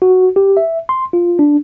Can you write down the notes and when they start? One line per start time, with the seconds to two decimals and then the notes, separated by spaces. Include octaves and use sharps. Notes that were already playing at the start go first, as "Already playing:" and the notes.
0.02 F#4
0.36 G4
0.57 E5
0.89 C6
1.13 F4
1.39 D4